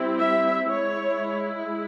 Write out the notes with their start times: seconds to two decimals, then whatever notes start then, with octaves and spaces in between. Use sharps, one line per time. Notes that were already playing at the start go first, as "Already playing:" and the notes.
Already playing: G3 C4 E4
0.19 E5
0.67 G#3 E4 C#5